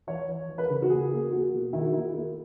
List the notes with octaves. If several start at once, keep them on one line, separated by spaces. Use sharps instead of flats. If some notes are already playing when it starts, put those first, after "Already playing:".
E3 C#5
E3
E3
B4
A#4
C#3
F#4
A#3 G#4
A#3
A#3 F#4
B2
D#3 E4
F#4
A#3 E4
A#3